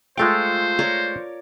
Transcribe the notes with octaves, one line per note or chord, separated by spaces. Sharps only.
G#3 A3 F4 A4 C5 F5 G5
A#4 C#5 D5